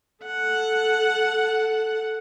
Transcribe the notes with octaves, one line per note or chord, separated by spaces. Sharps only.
A4 F#5